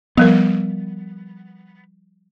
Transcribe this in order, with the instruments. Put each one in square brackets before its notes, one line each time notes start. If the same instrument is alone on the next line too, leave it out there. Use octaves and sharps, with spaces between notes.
[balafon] F3 G3 A#4 [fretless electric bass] B3